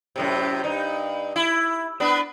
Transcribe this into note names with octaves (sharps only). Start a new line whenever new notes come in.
F#2 A2 C3
G2 D#4
E4
B3 D4 B4